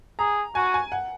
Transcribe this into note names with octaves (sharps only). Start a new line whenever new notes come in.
G#4 A#5
F#4 G#5
G#5
F#5